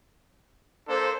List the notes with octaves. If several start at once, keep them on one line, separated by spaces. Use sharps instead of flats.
A#3 D4 A4 C5